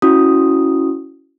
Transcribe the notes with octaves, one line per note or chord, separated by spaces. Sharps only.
C#4 E4 F#4 D#6